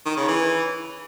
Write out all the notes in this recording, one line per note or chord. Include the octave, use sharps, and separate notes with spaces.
D#3
C#3
E3